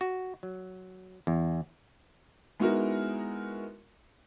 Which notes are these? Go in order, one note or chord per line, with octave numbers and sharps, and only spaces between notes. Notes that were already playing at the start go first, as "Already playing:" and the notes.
F#4
F#3
E2
G#3 B3 D#4 E4 F#4 A#4